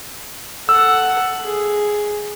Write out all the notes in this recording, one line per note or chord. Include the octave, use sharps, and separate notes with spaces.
A4 F#5 E6
G#4